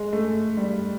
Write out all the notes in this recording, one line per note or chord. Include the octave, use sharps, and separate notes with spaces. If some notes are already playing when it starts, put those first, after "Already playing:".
Already playing: G#3
A3
G3